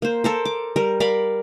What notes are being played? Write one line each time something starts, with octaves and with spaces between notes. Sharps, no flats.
A#3 C5
A4 A#4 C5
D6
G3 A#4
A#4 D5 F5 B5